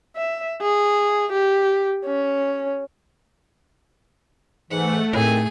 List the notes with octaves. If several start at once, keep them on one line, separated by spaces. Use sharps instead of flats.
E5
G#4
G4
C#4
G#2 E3 A3 F#5
A2 D#3 C4 G#4 G#5